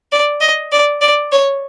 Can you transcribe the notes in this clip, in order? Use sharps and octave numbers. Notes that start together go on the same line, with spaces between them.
D5
D#5
D5
D5
C#5